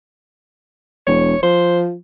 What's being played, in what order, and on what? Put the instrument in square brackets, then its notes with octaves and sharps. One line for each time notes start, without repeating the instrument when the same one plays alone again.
[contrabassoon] E1 [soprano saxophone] C#5
[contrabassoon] F3 [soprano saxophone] C5